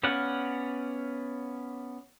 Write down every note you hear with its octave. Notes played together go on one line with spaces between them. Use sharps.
B3 C#4 D5 F5 F#5